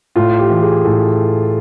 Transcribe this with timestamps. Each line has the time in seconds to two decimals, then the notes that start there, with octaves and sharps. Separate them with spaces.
0.16 A2 F4
0.39 G4
0.50 E3
0.62 G#4
0.85 A2 A4